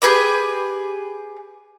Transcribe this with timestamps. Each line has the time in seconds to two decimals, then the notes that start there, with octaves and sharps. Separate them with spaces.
0.02 G4 G#4 B4 D5